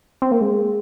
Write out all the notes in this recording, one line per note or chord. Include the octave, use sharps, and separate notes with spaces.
C4
A#3
G#3